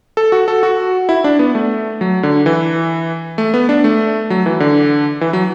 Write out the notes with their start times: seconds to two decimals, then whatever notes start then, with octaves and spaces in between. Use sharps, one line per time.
0.17 A4
0.32 F#4
0.48 A4
0.63 F#4
1.09 E4
1.24 D4
1.39 B3
1.55 A3
2.01 F#3
2.23 D3
2.46 E3
3.38 A3
3.54 B3
3.69 D4
3.84 A3
4.30 F#3
4.46 E3
4.60 D3
5.21 E3
5.33 F#3